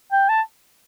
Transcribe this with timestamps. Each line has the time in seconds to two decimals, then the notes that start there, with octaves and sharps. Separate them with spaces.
0.12 G5
0.29 A5